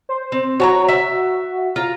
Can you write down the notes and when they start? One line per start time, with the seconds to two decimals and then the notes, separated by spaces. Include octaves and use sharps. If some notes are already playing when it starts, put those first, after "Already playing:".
0.09 C5
0.32 C4
0.60 F#4 C#5 A5 A#5
0.88 E5
1.76 F4 A#5